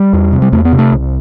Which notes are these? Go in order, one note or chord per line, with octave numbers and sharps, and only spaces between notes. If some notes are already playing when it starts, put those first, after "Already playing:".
Already playing: G3
E2
C3
G3
E2 A3
B3
C3
A3
C2